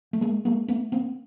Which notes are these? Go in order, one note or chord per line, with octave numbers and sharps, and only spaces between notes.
A3
G#3 A#3
G#3 A#3
A3 B3
A#3 C4